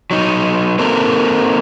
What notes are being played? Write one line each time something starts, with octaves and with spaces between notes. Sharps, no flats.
F#3 D#4
A#3 C4 D#4 A4 A#4